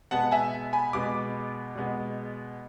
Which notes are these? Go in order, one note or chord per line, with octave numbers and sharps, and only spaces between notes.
B2 G#3 B3 F#5 A5
E5 G#5
G#5 B5
B2 G#3 B3 B5 D6
B2 G#3 B3